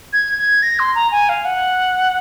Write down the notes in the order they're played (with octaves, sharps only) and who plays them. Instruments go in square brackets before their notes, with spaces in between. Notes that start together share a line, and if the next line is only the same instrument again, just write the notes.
[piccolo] G#6
G#6
A#6
C6
A#5
G#5
F5
F#5